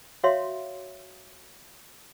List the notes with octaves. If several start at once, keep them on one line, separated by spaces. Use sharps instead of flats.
F#4 C#5 E5 F5 C6